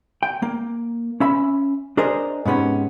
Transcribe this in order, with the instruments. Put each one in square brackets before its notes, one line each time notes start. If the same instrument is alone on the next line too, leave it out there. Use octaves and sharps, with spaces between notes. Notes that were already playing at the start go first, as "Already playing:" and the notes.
[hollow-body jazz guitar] G5
A#3
C#4 E5 B5
D4 G#4 A#4 C5 D#5
G#2 C3 B3 C#4